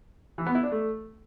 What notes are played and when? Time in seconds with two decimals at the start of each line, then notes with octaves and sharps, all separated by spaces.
0.38 E3
0.46 B3
0.55 E4
0.63 D4
0.72 A3